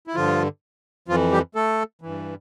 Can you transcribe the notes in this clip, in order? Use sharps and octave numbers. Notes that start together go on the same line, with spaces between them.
E4
G2 D3 F3 F4
F2 E3 F3 F4
G3 G4
A3 A4
G2 E3